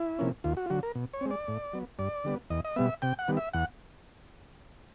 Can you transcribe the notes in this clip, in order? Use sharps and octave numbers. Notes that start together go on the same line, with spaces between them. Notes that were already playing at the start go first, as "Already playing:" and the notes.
Already playing: E4
C3 F3 A#3 C#4
D#2 F4
F#4
F4
D3 F#3 F#4
A#4
B2
C#5
G#3 C4
D5
A2
F#3 B3
G2 D5
D3 G3 B3
E2 D#5
D#5
B2 G3 B3 E5
C3 G5
F#5
D#3 G3 B3
E5
E2 F#5